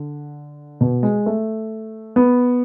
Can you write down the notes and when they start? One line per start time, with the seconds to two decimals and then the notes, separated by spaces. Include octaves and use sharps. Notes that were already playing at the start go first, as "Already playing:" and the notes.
Already playing: D3
0.81 B2
1.03 G#3
1.26 A3
2.16 B3